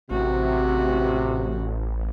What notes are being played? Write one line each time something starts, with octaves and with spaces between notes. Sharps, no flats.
A1 C3 F#4